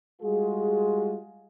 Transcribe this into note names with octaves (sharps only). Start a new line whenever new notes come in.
G3 G#3 F4 F#4 G#4